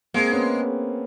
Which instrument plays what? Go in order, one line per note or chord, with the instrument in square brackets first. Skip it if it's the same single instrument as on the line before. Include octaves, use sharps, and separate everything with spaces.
[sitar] G#3 [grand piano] A#3 C4
[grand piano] B3 C#4